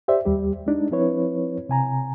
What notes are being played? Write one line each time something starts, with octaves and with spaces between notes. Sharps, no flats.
G4 C5 D5 E5
D#2 G3 G4
G#3 D4 D#4
F3 C4 E4 B4 C#5
C3 G#5 A#5